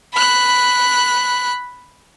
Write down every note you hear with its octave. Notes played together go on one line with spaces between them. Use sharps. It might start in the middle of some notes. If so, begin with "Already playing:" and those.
B5 F#6